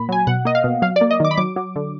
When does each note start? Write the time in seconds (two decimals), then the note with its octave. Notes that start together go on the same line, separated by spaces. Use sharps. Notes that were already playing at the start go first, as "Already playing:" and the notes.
Already playing: A#2 B5
0.09 F#3 G#5
0.27 B2 F#5
0.45 A#3 D#5
0.55 F5
0.64 B2
0.82 F#3 F5
0.96 D5
1.01 A#3
1.11 D#5
1.20 D#3 D6
1.31 B5
1.37 F#3 D6
1.56 F#3
1.76 D3